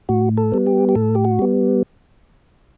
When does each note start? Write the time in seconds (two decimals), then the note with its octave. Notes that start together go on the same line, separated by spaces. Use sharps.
0.09 A2 F#4
0.37 A4
0.52 G3 B3
0.66 G4
0.89 G4
0.95 A2 A4
1.15 G4
1.25 F#4
1.39 G3 B3